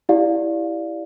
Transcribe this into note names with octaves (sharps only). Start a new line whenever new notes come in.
E4 G4 D5 F5